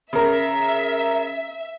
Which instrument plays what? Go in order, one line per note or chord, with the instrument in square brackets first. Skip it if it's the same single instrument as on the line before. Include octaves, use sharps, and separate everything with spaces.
[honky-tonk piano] C#3 A#4 [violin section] E5